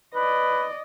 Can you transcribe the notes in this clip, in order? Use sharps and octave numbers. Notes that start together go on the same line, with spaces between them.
B4 D5 D#5